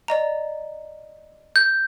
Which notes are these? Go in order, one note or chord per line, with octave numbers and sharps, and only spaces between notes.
D5 D#5 A#5
G6